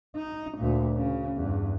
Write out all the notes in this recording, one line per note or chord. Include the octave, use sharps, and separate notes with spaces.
D#4
D2 A#2
C#3
E2 G2